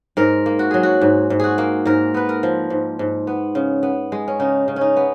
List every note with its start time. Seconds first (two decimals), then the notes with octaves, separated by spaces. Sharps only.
0.17 G#2 A#4
0.46 A#3
0.59 F#4
0.71 F#3 G#4
0.83 F#4
1.01 G#2
1.30 G#2
1.40 F#4 G#4
1.58 A#3
1.85 G#2 A#4
2.14 B3 B4
2.29 A#4
2.43 F3
2.70 G#2
2.99 G#2
3.27 B3
3.55 C#3
3.83 B3
4.12 G#3
4.28 C#4
4.40 C#3 D#4
4.68 C#3
4.76 C#4 D#4
4.97 B3